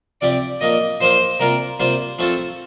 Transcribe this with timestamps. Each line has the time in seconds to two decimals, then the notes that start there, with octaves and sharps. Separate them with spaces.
0.21 C3 F3 C4 G4 D5
0.61 A#2 F3 A#3 D#5
1.00 A#2 F3 A#3 C5
1.40 C3 G3 A#3 F4 A#4
1.80 C3 G3 A#3 F4 C5
2.19 F3 A3 C4 F4 A4 C5